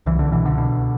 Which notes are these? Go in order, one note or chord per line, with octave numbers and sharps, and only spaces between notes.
C2 E3
D3
B2 E3
D3
B2